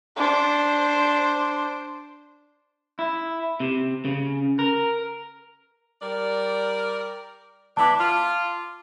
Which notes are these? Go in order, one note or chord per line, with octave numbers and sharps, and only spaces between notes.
D4 C5
E4
C3
C#3
A#4
G3 A#4 D5
B3 D4 E4 A5 D6
F4